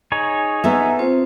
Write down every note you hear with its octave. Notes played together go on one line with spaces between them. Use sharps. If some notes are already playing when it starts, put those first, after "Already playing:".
D#4 G#4 C#5
B3 A4 E5 G#5 A#5
C4 F4 C5